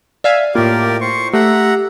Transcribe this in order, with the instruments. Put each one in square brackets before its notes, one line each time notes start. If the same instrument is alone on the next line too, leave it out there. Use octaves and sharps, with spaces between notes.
[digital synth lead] D5 [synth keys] E5 F5 G#5
[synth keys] A2 A#3 [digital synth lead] F4 [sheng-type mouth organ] G4 A#4 D5
[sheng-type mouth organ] C5 C#6
[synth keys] A3 [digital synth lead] G4 [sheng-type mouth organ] E5 F#5 A#5